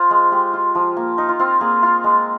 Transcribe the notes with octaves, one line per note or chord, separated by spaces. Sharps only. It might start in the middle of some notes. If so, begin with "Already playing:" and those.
Already playing: F4 C5
G#3
G#3 G4
F4
F3
A#3
D#4
F4
C4 F4
A#3 G#4
F4
G#3